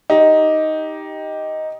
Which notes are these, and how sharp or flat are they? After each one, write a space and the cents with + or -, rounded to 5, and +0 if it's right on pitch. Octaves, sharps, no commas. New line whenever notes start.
D#4 +10 G4 +0